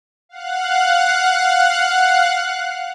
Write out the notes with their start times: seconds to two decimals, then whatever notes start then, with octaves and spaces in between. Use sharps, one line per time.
0.29 F5 F#5 F#6